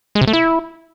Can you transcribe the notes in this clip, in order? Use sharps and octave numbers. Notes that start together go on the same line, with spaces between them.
G#3
C3
A3
E4